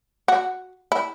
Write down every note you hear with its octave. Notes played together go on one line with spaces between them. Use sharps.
F#4
E4